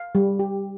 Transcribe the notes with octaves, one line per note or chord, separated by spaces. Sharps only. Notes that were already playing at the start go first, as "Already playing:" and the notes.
Already playing: F5
G3
G4